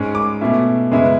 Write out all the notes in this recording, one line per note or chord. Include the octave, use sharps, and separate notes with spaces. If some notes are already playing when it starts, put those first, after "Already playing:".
Already playing: G#2 G#3 C#4
D6
B2 A3 C#4 E4
F#2 C#3 G#3 B3 E4